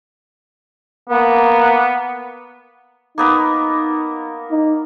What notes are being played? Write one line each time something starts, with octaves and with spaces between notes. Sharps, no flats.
A#3 B3
A#3 B3 D#4 A#4
D#4